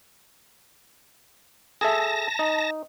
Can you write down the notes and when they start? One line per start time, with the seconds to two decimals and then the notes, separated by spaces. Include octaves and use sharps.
1.81 G#4 A4 E5 A5 A#6
2.39 D#4